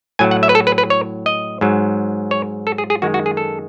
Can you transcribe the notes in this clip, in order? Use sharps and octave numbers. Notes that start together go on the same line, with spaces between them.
A2 F#3 G#5
F#5
E5
B4
A4
B4
B4
C#5
D#5
G#2 F#3
C#5
A4
G#4
G#4
F#2 D#3 G#3 F#4
F#4
G#4
A4